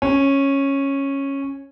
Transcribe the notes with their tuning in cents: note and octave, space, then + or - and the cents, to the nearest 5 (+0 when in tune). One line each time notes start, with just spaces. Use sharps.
C#4 -10